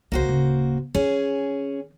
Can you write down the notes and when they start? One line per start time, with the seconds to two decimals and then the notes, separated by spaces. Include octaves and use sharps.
0.12 C2 C#3 A#3 F#4 C5
0.28 D1 C#3
0.94 D#3 C4 C#4 G#4